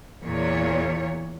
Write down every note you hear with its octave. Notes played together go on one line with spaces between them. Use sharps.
E2 A#2 C#5